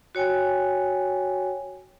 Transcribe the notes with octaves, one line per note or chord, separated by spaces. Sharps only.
F#4 C#5 G5 G#5